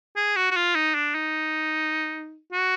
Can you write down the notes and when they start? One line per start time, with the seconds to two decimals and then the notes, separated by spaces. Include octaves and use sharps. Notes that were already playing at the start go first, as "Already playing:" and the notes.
0.16 G#4
0.36 F#4
0.51 F#4
0.56 F4
0.75 D#4
0.95 D4
1.15 D#4
2.53 F#4